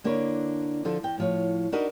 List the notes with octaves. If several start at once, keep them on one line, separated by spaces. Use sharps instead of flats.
D3 A#3 D4 E4 B4 C#5
D3 F3 A4
E2 G5
A2 F3 C#5
D4 D#4 F#4 A#4 B4 D#5